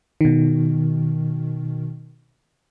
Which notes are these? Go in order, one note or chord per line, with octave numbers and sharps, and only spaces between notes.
B2 D#3